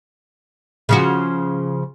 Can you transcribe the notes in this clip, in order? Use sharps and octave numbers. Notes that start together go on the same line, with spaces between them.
C#3 F3 F#4